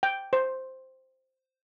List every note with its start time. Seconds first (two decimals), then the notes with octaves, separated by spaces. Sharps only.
0.03 G5
0.33 C5